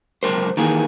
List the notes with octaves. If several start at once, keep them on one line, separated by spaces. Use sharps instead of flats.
C#2 F#2 D#3 A#4 C5
D#3 E3 A#3 G#4